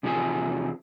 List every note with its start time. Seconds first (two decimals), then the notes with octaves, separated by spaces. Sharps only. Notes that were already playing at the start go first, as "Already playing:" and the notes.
0.03 E2 C3 F3 G3 G#4 G#5